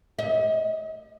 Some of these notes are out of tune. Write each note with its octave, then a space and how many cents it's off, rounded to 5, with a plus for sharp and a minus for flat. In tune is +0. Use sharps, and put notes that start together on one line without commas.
D#5 +35